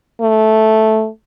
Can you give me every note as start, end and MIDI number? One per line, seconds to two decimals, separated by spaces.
0.21 1.08 57